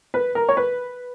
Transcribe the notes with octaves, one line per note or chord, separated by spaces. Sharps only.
B4
A#4
C#5
B4